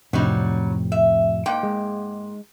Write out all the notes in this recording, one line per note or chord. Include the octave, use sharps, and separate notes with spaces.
F2 A2 C3 F#3 G3 D#4
E5
G#2 A#3 G5
G#3